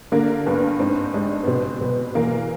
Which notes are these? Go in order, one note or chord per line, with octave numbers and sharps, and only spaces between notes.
D3 A#3
G2 B3
G#2 C4
G#3 D4
B3
B2 C4
B2 B3
E2 A#3